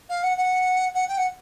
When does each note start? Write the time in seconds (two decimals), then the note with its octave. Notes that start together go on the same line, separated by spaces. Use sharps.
0.09 F5
0.23 F#5
0.37 F#5
0.94 F#5
1.08 G5
1.17 F#5